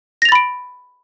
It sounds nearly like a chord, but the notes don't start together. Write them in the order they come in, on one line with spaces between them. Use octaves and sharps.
A#6 F7 A6 B5 D7